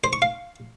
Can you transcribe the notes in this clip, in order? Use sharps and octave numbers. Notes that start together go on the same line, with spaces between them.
C5
C#6
F5